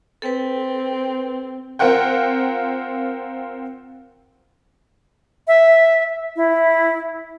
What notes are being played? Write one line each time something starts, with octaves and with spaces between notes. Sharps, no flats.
C4 A4 B4
C4 F4 A#4 F#5 G5
E5
E4